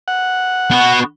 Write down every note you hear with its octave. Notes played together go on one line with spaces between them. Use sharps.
F#5
B3 F#4